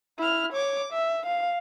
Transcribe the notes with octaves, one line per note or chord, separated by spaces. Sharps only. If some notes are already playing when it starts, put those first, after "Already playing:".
E4 F6
C#5 D6
E5
F5